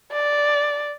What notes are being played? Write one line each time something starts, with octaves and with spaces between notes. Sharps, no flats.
D5